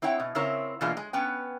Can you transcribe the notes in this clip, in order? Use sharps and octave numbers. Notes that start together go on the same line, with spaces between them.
C4 E4 C#5 F#5 G5
B2
C#3 C4 E4 A#4 C#5
B2 E3 A#3 D4 F4 G#4
G#3
B3 C#4 B4 G5